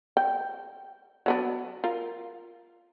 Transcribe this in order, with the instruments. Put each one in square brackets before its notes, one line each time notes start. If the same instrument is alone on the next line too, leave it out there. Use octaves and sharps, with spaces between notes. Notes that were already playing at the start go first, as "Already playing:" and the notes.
[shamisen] G5
F#3 B3 D4
F4 A#4